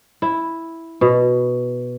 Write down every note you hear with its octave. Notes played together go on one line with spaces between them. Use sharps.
E4
B2